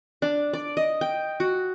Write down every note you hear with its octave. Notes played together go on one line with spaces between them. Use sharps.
D4
D5
D#5
G5
F#4